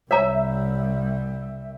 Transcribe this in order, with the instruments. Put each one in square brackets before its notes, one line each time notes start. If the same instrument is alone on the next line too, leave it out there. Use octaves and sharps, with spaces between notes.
[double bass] C2 G3 [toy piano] C#5 A#5 [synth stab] E5